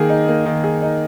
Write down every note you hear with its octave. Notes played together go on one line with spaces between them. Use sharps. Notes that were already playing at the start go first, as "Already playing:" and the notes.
Already playing: D#3 A#3 G#4
D#4
A#3
D#3
G#4
D#4